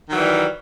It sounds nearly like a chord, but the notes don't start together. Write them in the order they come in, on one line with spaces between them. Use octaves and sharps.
D#3 F#3 E3 G3